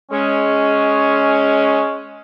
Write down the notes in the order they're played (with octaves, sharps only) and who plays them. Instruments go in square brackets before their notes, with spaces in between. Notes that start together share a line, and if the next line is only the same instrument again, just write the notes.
[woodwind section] G#3 C#4